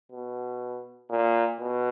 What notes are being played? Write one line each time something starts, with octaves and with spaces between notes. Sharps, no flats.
B2
A#2
B2